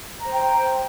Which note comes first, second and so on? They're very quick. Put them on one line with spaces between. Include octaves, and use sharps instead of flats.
A#5 C5 G5